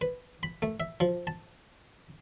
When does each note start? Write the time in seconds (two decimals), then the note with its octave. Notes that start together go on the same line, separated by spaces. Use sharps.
0.01 B4
0.43 B5
0.62 A3
0.80 E5
1.00 F3
1.27 A5